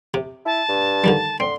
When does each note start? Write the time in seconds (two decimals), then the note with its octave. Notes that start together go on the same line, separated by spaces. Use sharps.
0.14 C3
0.46 E4 A5
0.69 G2
1.04 D3 D#3 G3
1.40 D3 C4 C6